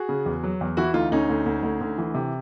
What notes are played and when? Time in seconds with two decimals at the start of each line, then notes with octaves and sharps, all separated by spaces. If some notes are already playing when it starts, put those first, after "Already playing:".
Already playing: F#4 G#4
0.09 C#3
0.26 E2
0.44 F#3
0.61 E2
0.77 E3 E4 F#4
0.94 D2 D#4 F4
1.12 D2 C#4 D#4
1.30 D2
1.46 D2
1.63 D2
1.81 D2
1.98 E3
2.14 C3